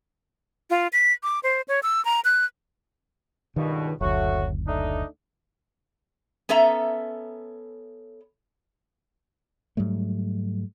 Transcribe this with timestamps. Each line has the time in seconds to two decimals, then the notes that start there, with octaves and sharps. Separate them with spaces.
0.70 F4
0.93 B6
1.23 D6
1.43 C5
1.68 C#5
1.83 E6
2.05 A#5
2.25 F#6
3.56 C#2 G2 B2 D#3
4.01 F#1 D2 F#3 A3 F#4
4.67 A3 D4 D#4
6.49 B3 C#4 A4 E5 A#5
9.77 G#2 F#3 G3 A3